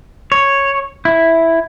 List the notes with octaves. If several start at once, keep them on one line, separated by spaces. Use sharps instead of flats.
C#5
E4